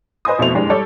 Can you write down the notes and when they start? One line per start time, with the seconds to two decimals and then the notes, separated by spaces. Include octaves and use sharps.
0.25 B4 C5 D#5 G#5 C6 D#6
0.39 F2 B2 A3 C5 F7
0.55 F#1 G#3 D4 G4
0.70 G3 A4 C#5 D5